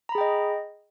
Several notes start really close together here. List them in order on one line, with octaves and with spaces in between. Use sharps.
A#5 B5 G#4 G5 D#5